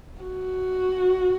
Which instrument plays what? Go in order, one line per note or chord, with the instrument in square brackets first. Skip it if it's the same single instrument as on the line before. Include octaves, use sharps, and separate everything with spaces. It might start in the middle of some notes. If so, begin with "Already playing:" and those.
[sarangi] F#4